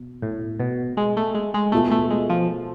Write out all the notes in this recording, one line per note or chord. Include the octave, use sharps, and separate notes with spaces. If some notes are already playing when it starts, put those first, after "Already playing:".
Already playing: B2
A2
B2
G#3
A3
G#3
G#3
B2 A3 B3 F4 A4
A3
G#3
F3